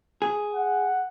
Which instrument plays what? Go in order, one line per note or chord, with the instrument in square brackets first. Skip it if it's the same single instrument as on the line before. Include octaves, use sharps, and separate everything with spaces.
[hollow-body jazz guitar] G#4
[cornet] F#5